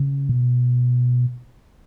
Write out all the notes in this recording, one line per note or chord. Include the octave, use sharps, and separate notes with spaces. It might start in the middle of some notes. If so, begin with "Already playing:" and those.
Already playing: C#3
B2